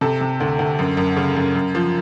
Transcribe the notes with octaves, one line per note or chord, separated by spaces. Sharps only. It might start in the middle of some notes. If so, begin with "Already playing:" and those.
C3 A4
C3
D2
D2
F#2
F#2
C#3
F#2
F#2
F3